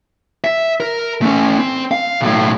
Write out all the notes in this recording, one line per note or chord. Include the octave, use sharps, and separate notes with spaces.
E5
A#4
A3 C#4
C4
F5
B1 A2